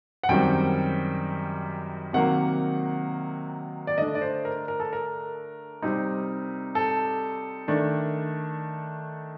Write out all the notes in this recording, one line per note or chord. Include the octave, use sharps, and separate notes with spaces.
F#5
F#2 D#3 G3 C4 G5
C3 D#3 F#3 A#3 F#5
D5
D3 A3 D4 D#5
D5
C5
A#4
A#4
A4
A#4
C3 G3 C4 D#4
A4
D#3 A3 D4